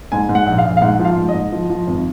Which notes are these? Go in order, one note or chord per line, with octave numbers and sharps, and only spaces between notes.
G#2 G#5
G#2
F#5
A#1
F5
A#1
F5
G#2 F#5
F3
F5
G#2
D#5
G#2
F3
F3
G#1